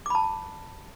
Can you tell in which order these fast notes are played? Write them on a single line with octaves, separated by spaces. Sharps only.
D6 B5 A5